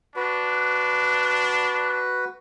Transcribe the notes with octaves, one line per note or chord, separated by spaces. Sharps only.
D4 F#4 B4